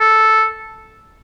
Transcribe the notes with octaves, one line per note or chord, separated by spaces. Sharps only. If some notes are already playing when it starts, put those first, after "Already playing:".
A4